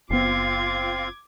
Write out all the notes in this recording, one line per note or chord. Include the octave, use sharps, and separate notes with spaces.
F#1 B3 C4 F4 D6 G#6 C7